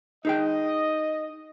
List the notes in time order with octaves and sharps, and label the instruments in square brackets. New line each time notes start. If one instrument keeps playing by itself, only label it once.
[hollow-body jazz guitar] D#4 G#4 G5 [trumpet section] D#5